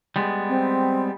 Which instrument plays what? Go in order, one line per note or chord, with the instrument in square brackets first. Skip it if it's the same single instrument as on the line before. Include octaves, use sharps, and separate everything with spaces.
[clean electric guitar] G3 G#3 B3
[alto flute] C4